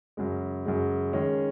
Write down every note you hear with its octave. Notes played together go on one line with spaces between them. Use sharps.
F#2 C#3 G#3
F#2 C#3 G#3
D#3 G#3 C#4 G#4